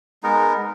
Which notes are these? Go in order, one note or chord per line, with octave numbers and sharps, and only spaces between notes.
G#3 B3 D#4 A#4